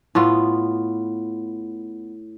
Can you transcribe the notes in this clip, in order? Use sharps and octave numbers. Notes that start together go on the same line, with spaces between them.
A2 B3 F4